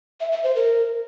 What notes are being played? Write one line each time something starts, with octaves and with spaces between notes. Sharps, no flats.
E5
E5
C5
A#4